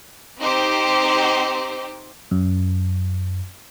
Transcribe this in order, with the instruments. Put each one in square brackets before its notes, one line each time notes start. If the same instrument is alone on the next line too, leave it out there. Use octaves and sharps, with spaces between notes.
[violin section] C4 D#4 G4 C5
[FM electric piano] F#2